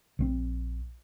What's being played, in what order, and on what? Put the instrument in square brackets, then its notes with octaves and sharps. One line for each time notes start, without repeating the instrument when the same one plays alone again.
[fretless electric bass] A#1 F3 C4